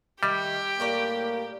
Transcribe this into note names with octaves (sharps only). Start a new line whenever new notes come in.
D#3 G3 A3 G4
A2 A#3 A#4 D5